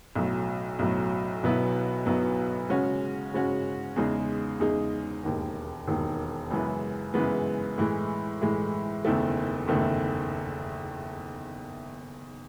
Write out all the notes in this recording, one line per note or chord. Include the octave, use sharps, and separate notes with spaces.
B1 A2 F#3
B1 A2 F#3
B1 B2 F#3 B3 E4
B1 B2 F#3 B3 E4
C#3 G#3 C#4 F#4
C#3 G#3 C#4 F#4
E2 C#3 G#3 D#4 G#4
E2 C#3 G#3 D#4 G#4
E1 D#2 D#3
E1 D#2 D#3
F#2 C#3 E3 G#3 B3
F#2 C#3 E3 G#3 B3
A2 E3 G#3
A2 E3 G#3
F#1 E2 D#3 A3 E4
F#1 E2 D#3 A3 E4